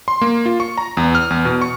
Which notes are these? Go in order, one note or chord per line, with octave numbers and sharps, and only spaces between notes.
C6
A#3
F4
C#6
A#5
E2
F6
E2
B2
C#6